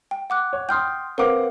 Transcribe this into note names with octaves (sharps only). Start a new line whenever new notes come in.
G5
F#5 D6 F#6
C#5
G5 C6 D#6 F6 G6
C4 A#4 B4 F5 F#5 D6